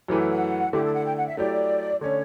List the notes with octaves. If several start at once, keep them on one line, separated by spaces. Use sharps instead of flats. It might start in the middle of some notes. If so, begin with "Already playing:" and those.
F#2 E3 A3 E4 G4 B4
F#5
F#5
D3 A3 E4 G4
A4
F#5
G5
F#5
E5
F#3 A3 E4 G4 D5
D3 A3 C#4 C#5